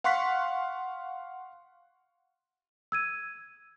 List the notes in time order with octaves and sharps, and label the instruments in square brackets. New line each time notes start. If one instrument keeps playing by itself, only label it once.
[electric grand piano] F5 F#5 C6 C#6 F#6 B6
[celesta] E6 G#6 D#7